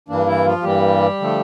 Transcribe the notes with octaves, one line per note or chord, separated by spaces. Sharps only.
G2 E3 A#3 D4
E3 E4
F3 F4
G2 E3 G3 A#3 G4
D3 F3 A3